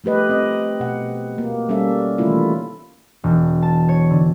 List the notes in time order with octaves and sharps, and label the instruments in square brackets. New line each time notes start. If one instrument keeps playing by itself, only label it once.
[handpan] F3 A3 G4 B4 D#5
C4 D#5
B2 F#5
A#3
G3 A#3 C#4 A4 E5
D#3 E3 A3 C#4 E4 F4
[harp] E1
A5
C#5
D3